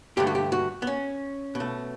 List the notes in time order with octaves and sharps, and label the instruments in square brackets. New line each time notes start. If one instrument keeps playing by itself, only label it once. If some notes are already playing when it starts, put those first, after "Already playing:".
[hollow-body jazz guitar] G2 D3 A3 G4
F#4
G4
F#4
B3
C#4
B2
A3